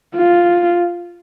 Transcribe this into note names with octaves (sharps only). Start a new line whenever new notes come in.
F4